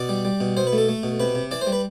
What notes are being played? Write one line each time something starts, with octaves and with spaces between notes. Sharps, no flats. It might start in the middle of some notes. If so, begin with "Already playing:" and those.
Already playing: B2 D5
G3
G3
B2
B2 C5
B4
A3
A4
A3
B2
C3 B4
C3
E3 D5
C5
G3
B4